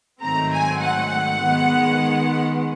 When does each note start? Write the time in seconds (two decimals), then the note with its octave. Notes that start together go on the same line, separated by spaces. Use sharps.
0.22 G#2 D#3 F#3 A3 C4 A#5
0.53 G#5
0.83 F#5
1.43 D#3 G#3 B3